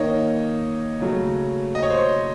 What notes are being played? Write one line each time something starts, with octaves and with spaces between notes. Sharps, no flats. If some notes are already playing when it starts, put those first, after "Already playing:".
Already playing: D#3 A#3 D#4 C#5 D#5
C#3 F#3 A3
D#5
C#5
C5
C#5